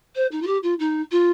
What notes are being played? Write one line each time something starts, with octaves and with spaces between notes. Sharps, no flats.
C5
D#4
F4
G4
F4
D#4
F4